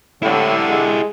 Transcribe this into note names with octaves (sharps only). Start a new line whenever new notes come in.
A2 D3 E4 G4
G#3